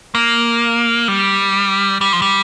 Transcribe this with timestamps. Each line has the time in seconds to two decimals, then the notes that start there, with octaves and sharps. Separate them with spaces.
0.15 A#3
1.08 G3
2.01 G3
2.13 F3
2.22 G3